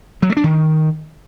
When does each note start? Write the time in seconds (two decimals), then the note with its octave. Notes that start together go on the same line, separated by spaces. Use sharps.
0.22 F#3
0.30 A3
0.37 D4
0.44 D#3